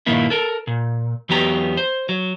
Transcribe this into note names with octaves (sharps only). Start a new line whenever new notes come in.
G2 A#2 D#3 A#3 E4
A4 A#4
A#2
E2 F#3 B3 G4 A#5
C5
F#3